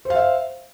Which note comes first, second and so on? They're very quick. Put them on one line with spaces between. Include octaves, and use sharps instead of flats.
C5 F5 E5